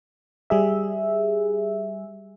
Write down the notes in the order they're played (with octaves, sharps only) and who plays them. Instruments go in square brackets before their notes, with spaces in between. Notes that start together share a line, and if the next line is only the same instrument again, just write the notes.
[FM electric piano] G3 G#4 E5